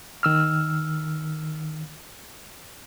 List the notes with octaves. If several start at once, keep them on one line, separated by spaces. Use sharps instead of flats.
D#3 E6 F6